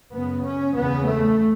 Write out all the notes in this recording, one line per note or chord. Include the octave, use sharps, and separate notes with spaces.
F#2 C#3 B3
C#4
E2 C#3 B3
A3